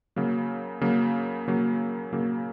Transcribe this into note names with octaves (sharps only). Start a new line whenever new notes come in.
C#3 F#3 A#3
C#3 F#3 A#3
C#3 F#3 A#3
C#3 F#3 A#3